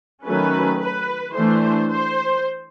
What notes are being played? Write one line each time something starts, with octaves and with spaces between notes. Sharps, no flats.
D#3 F#3 A3 C#4 B4
B4
E3 A3 D4 C5
C5